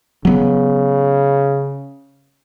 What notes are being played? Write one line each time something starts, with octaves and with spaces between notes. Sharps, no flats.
C#3 F#3 B3